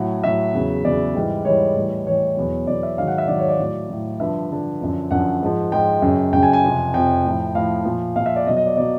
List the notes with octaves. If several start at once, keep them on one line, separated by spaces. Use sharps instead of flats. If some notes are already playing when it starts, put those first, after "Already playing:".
Already playing: A2 F#3 F#5
A2 F#3 E5
E2 C#3 F#3
E2 C#3 F#3 D5
G#2 E3 G3
G#2 E3 G3 C#5
A2 E3 G3
A2 E3 G3 C#5
E2 B2 F#3
E2 B2 F#3 D5
E5
G#2 D#3 F#3 F5
F#5
E5
G#2 D#3 F#3 D5
C#5
D5
A2 F#3
A2 F#3
G2 D3 F3 E5
G2 D3 F3
F#2 D3 F3
F#2 D3 F3 F#5
G#2 F3
G#2 F3 G5
F#2 C#3 F#3
F#2 C#3 F#3 G5
G#5
G#5
F2 C3 F3
F2 C3 F3 G5
A2 F3
A2 F3 F5
A#2 F3
A#2 F3 F5
E5
D5
B2 F#3 D#5
D#5
D5
B2 F#3 D5